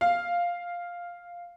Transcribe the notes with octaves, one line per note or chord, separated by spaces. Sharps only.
F5